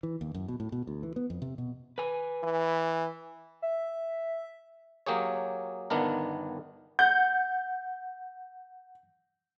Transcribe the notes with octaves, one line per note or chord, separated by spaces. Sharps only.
E3
D#2
F#2
B2
A2
B2
D2
E3
B3
F2
C3
B2
B4 G#5
E3
E5
F#3 A#3 G4 G#4 C#5
G1 D#3 B3 D4 A#4
F#5 G6